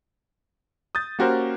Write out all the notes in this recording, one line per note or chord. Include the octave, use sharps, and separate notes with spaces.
D#6 G6 A6
A#3 C#4 F#4 G4 A#4 C5